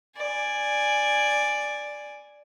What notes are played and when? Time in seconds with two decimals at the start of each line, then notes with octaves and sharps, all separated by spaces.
0.17 D5 G#5